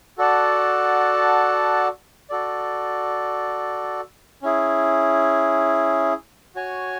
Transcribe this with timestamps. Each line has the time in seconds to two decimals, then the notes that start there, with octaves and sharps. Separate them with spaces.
0.18 F#4 A4 D5 F#5 A5
2.30 F#4 A4 D5
4.42 C#4 E4 G#4
6.55 F#4 C#5 G#5